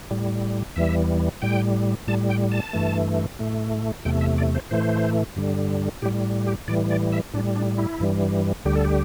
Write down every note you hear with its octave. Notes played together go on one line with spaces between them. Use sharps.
A2 G3
E2 E3 G3 E5
A2 G3 G5
A2 G3 A5
G5
A5
G2 E3 A3
A2 A3
E2 C3 A3 G5
E5
D5
C5
A2 E3 A3 C5
G2 D3 G3
A2 G3 G4
G4
A2 E3 G3 D5
D5
E5
A2 G3 D4
D4
E4
G2 E3 G3
D2 D3 G3 G4
A4
G4